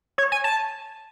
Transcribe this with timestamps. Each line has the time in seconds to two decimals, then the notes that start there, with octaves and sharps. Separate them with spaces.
0.18 C#5
0.32 G#5
0.44 A5